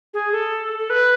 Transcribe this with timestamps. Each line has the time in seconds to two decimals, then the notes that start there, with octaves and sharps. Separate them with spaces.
0.14 G#4
0.32 A4
0.79 A4
0.90 B4